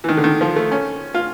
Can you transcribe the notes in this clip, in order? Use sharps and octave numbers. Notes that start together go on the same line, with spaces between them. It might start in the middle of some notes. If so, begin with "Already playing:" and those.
E3
D#3
D3
D#3
F3
A3
C#4
F4